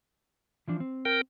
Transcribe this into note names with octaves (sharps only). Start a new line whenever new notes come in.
E3 F3 D4
C4
A#4 G5